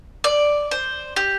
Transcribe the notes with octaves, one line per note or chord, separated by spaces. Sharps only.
D5
C5
G4